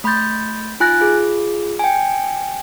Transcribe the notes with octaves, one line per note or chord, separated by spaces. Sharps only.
A3 B5 C6 G6 A6
D#4 F4 G#5 F#6 A6 A#6
F4 G#4
G5 G#5